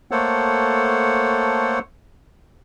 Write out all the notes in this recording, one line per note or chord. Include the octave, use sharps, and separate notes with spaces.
A3 A#3 A4 C5 C#5 F#5